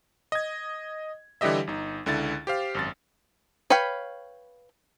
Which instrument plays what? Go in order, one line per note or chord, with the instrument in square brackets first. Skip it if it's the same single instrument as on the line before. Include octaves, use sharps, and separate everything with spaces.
[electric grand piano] D#5 G#6
D3 E3 G3 G4 D#5 E5
G1 D#4
C#2 D3 E4 A6
G4 C5 F5
G#1 F#2 A6
[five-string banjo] B4 C#5 F5 G5 B5